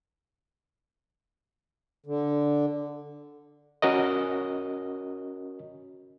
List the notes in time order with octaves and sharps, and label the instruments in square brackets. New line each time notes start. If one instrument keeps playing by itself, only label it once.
[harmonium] D3
[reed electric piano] C#4 F#4 A#4 D#5